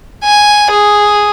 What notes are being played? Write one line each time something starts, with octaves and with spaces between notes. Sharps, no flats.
G#5
G#4